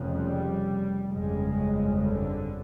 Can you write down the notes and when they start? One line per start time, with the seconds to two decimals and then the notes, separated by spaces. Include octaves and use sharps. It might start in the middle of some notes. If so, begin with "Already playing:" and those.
Already playing: F1 F2 C#3
0.17 G3
1.11 G1 F2 C#3 G#3
2.07 D3